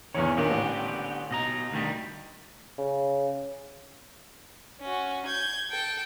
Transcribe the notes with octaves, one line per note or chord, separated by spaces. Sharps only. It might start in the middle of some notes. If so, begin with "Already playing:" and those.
E2 D#3 E3 C#4 C#5
A#2 D3 D#3 B3 G4
A1
B2 D#5 A#5
D2 D#3 G3
C#3
C#4 F#4
G6 G#6
A4 G5